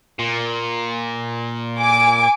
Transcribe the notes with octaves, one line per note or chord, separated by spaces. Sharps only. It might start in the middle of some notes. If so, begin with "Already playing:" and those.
A#2
G#5 D6